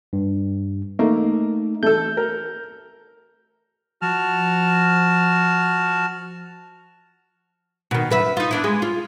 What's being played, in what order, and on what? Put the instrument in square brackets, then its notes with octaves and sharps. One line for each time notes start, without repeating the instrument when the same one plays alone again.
[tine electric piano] G2
[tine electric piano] A3 D#4 [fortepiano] A#3
[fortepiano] A3 A4 [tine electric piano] G6
[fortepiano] A#4
[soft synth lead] F3 [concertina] F#4 A5 F6
[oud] B2 D#3
F#2 B4 E5
D#4 F4
B3 D4 E4
G#3
F4